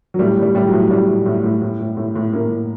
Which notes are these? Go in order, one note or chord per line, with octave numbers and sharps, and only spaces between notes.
F#3
A2 G3
A2 G3
A2 G3
F#3
A2
A2 G3
A2
A2
A2
A2
A2
A2
A2
A2 A#3
A2